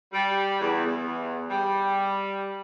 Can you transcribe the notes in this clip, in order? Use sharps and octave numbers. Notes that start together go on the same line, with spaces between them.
G3
E2
E2
G3